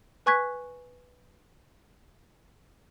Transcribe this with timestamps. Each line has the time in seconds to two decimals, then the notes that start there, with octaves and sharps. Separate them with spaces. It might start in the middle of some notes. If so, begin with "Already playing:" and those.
0.26 B4 G#5 C#6 F#6 G#6 B6